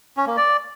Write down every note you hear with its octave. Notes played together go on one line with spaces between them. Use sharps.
C#4
A#3
D5